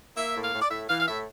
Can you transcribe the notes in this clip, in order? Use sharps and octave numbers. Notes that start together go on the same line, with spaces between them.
A#3 E5
A2
F5
A2
D5
A2 E5
E3 F5
F5
A2 E5